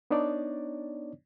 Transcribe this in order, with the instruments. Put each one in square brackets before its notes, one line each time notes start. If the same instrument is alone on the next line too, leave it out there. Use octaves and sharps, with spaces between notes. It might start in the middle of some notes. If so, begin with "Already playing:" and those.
[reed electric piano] B3 D4 D#4 C#5 D5